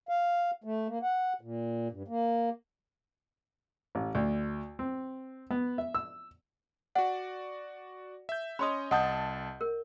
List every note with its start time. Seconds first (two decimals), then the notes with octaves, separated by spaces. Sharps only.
0.09 F5
0.64 A3
0.88 A#3
1.03 F#5
1.41 A#2
1.90 G2
2.08 A#3
3.95 A1
4.15 D2
4.79 C4
5.51 B3
5.78 E5
5.94 E6
6.95 F#4 D5 F#5
8.29 E5 G6
8.59 C#4 C#5 D#5 B5 C6 D#6
8.91 C2 D#5 F#5 A5 D#6 G6
9.61 A#4